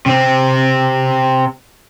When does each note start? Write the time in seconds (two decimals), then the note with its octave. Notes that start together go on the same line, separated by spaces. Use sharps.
0.06 C3 C4